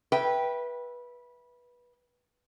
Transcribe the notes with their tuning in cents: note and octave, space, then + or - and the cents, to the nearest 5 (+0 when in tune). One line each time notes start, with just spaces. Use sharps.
B4 -20 E5 +0 G5 +0